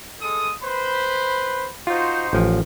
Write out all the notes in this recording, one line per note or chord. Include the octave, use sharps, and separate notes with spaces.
G#3 A4 D#6
B4 C5 B5
D#4 F4 F#4 C5
A1 F3